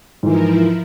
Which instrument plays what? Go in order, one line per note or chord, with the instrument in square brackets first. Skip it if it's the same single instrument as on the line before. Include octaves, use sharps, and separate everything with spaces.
[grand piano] G#2 E3 [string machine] F3 E4 A#4